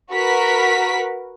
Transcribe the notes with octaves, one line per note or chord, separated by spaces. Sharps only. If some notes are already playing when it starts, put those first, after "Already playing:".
F#4 A#4 B4 B6